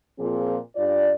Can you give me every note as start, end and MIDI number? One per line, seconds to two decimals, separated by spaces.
0.19 0.56 46
0.19 0.56 53
0.19 0.56 60
0.19 0.56 65
0.19 0.56 68
0.75 1.11 43
0.75 1.11 65
0.75 1.11 74